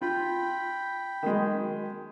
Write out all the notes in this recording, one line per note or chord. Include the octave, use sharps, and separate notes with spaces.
F4 G5 B5
D#3 F#3 G#3